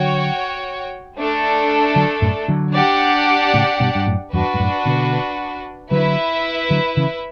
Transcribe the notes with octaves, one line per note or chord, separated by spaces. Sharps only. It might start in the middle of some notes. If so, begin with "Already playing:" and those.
Already playing: D3 F#3 F#4 C#5 G5
A3 D4 A4
D3 F#3
F#2 A2
D3 F#3
D4 G4 D5 F#5
A2 C#3
G2 B2
G2
F#2 A2
E2 G2 D4 F#4 B4
G2
F#2 A2
B2 D3
D3 F#3 E4 B4 E5
D3 F#3
C#3 E3